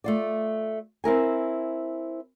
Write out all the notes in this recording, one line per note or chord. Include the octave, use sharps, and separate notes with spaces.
A3 F4 D5
C4 E4 A#4 G#5